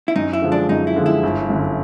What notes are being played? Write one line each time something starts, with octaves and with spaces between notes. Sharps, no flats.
E4
F#2 D#4
E4
D3 F3 G#3
D4
F#2 D#4
E4
D3 F3 G#3
E4
G1
F#2 D3